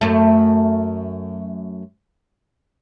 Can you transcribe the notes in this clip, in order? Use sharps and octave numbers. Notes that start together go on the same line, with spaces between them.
F#2 A3